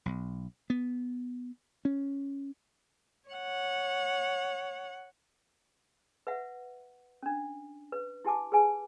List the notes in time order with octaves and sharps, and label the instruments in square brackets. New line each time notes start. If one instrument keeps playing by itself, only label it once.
[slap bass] B1
B3
C#4
[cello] C#5 F#5
[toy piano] B4 E5 F#5
C#4 D4
B4
E4 G4 G#5 A5 D6
G#4 B4 G#5